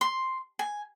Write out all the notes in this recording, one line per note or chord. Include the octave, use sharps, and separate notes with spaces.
C6
G#5